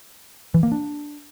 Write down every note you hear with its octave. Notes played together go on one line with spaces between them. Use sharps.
E3
A#3
D4